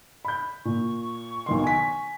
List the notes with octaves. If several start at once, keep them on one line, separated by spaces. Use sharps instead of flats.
B5 G6
A#2 C#6
B1 D#3 C6
G#5 B6